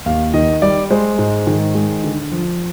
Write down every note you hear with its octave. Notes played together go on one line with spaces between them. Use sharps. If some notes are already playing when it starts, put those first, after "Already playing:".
D#2 F5
D#3 D#5
G3 D5
G#3 C5
G#2
D#3
G#3
D3
F3